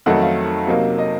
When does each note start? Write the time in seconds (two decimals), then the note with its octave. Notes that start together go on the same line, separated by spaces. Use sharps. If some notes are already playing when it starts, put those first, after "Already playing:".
0.06 F2 D#3 F#3 A3 D#4 F#5
0.22 F5
0.67 C3 F#3 A#3 D#4
0.98 D#5